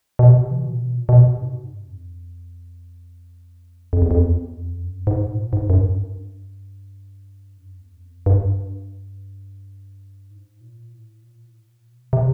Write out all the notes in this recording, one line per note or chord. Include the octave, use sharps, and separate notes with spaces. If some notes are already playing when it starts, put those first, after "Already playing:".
B2
C3
E3
A#2
B2
A#2
B2
C3
G#2
G2
F2
F2
E2
F2
E2
F2
F#2
G#2
A#2
G#2
F#2
G2
F#2
E2
F#2
F2
G2
G#2
A#2
A2
A#2
A2
A#2
B2
C3